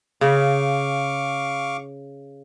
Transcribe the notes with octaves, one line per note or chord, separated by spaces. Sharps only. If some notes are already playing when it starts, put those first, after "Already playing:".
C#3 F5 C#6 D6